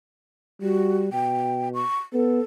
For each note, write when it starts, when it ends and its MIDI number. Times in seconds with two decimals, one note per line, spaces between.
0.62 1.09 55
0.62 0.99 66
1.13 1.84 47
1.13 1.69 79
1.74 1.98 85
2.13 2.41 59
2.13 2.44 69